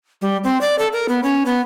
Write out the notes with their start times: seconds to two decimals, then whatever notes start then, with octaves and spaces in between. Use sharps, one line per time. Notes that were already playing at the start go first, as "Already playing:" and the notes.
0.21 G3
0.44 C4
0.61 D5
0.79 A4
0.93 A#4
1.09 B3
1.23 C#4
1.46 B3